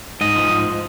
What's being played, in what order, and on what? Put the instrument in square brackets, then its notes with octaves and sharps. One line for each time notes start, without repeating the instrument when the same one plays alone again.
[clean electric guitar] G#2 D#5
F3
G#2